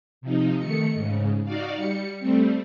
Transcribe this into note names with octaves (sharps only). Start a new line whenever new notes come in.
C3 F3 D#4
D#3 A3 C#7
G#2 C#3
D#4 F#4 D5 F5
G3 C#7
G3 A3 C4